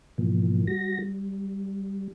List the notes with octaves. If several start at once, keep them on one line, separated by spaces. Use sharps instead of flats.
G#2 B2 E3 F3 A#3
G3 F#4 A#6
G3